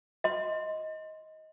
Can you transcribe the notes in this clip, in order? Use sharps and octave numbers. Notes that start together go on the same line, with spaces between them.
D#5 C6